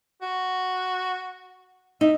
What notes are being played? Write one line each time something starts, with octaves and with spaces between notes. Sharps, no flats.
F#4
D#4 E5